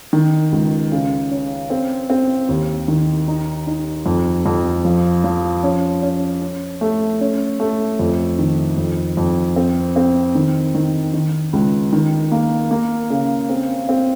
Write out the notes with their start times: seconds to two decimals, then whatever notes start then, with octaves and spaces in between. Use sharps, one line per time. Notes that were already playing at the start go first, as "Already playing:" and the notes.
0.13 D#3
0.52 C#2
0.92 C#3
1.31 C#4
1.70 C4
2.10 C4
2.49 D#2
2.88 D#3
3.28 D#4
3.67 D#4
4.06 F2
4.46 F2
4.85 F3
5.24 F3
5.63 C#4
6.03 C#4
6.42 C#4
6.81 A3
7.21 C#4
7.60 A3
7.99 F2
8.39 D#3
8.78 F2
9.17 F2
9.56 C4
9.96 C4
10.35 D#3
10.74 D#3
11.14 D#3
11.53 C#2
11.93 D#3
12.32 A#3
12.71 A#3
13.10 C#3
13.49 C4
13.89 C4